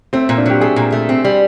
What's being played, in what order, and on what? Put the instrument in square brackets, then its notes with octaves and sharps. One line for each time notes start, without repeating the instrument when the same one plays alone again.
[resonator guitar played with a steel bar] A3 [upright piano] C4
[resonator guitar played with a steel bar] A#2
[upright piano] D4
[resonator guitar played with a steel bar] F#3 [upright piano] G4
[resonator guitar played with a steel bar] A3 [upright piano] G#4
[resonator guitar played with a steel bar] A#2
A3
C4
G3